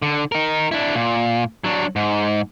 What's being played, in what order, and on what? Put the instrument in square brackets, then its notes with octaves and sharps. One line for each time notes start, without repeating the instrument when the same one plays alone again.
[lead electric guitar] D3
D#4 A#4
D4 E4
A#2
F#3 D4
G#2